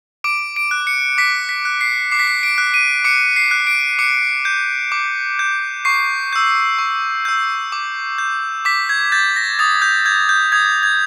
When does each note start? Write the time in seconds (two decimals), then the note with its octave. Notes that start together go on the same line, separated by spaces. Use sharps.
0.24 D6 D7
0.56 D7
0.71 F#6
0.87 C#7
1.18 D6 B6
1.49 B6
1.65 F#6
1.81 C7
2.11 D6 C7
2.19 B6
2.27 C7
2.43 D7
2.58 F#6
2.74 D#7
3.04 D6 C#7
3.36 C7
3.51 F#6
3.67 D7
3.99 D6 C#7
4.45 G6
4.92 D6
5.39 G6
5.85 C#6 C7
6.33 E6 G6
6.78 C#6
7.25 E6 G6
7.72 D6
8.18 G6
8.65 D6 B6
8.89 G#6
9.12 G6 A6
9.36 A#6
9.59 D#6 A6
9.82 G6
10.06 G6 G#6
10.29 G6
10.52 D#6 G#6
10.83 G#6